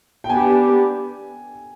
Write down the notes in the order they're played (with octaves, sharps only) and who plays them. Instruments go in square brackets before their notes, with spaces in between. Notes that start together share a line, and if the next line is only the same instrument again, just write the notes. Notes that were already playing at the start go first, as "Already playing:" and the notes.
[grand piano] G5
[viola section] B3 D4 G4 [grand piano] G#5